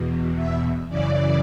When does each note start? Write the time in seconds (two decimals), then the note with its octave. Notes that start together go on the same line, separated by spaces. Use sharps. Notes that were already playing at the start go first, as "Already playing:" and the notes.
Already playing: E2 B2
0.36 E5
0.88 F#2 C#3 E3 D5